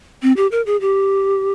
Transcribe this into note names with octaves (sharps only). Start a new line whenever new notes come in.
C4
G4
A#4
G#4
G4